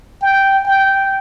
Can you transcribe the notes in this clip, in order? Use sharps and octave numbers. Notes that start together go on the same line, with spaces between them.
G5
G5